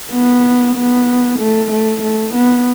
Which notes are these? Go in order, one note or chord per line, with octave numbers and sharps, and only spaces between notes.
B3
B3
A3
A3
A3
B3